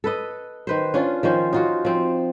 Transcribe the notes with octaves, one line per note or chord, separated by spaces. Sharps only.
A4 B4 D#5
D#3 B4 C5
C#4 D4 F4
D#3 F3 C#4 C5
D#4 F4 F#4
F3 C4